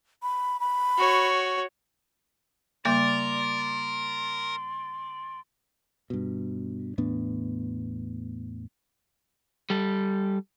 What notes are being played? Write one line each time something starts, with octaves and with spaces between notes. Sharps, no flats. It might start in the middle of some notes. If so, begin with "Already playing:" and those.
B5
B5
F#4 C#5
C#3 G3 A#3 A#4 D5 C6
G2 B2
E2 A2 B3 D4
G3 A4